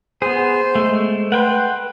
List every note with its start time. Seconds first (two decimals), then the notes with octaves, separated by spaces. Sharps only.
0.22 B3 G#4 C5
0.75 G#3 A3
1.32 B4 F#5 G5 C6